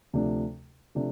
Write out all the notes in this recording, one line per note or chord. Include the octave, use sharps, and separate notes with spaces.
D2 C3 F3 A3 D4
C3 F3 A3 D4